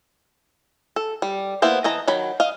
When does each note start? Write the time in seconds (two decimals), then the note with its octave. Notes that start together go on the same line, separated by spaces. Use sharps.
0.96 A4
1.22 G3
1.62 A#3 B3 E4 C5
1.84 E3 D#5 A5 A#5
2.07 D#3 F#3 B5
2.40 D#5 F5